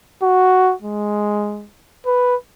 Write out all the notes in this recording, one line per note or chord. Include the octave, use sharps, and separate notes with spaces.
F#4
G#3
B4